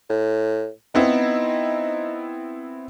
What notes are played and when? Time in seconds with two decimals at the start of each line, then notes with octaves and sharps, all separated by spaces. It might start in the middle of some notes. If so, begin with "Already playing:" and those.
0.10 A2
0.95 B3 C4 D#4 E4